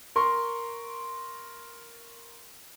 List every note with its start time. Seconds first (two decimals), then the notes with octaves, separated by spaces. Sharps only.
0.16 A#4 C6 C#6